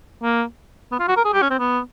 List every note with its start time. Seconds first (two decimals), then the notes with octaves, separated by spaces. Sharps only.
0.23 A#3
0.92 B3
0.99 F4
1.08 F#4
1.16 A#4
1.25 G#4
1.33 G4
1.42 C#4
1.50 C4
1.59 B3